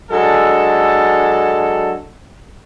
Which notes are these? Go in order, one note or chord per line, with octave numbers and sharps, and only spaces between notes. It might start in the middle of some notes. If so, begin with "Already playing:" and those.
F#3 G#3 D4 A4